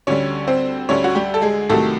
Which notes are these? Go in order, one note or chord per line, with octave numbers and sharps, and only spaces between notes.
D2 D3 G3 C#4 C#5
C4 C5
D2 D3 G3 C#4 C#5
F#4
G3 G4
A4
G#3 G#4
C2 C3 D#3 F#3 A3 A4